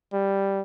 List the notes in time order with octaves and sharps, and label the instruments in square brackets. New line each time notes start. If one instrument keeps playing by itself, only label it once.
[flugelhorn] G3